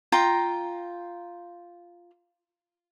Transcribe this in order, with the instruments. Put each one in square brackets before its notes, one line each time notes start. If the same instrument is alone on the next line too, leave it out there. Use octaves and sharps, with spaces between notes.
[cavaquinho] F4 G5 A#5